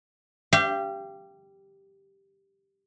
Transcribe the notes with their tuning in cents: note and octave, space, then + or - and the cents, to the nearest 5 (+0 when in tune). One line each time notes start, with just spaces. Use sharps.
G4 +0 F5 -40